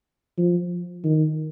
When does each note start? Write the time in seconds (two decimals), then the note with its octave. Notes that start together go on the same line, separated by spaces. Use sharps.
0.38 F3
1.04 D#3